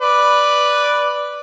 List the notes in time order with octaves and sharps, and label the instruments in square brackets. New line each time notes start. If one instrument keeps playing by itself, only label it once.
[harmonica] B4 D5